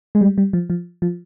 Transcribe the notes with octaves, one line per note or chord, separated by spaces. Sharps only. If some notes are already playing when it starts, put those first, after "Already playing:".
G#3
G3
G3
F3
F3
F3